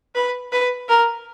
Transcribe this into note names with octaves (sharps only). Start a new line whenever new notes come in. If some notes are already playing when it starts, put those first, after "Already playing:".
B4
B4
A#4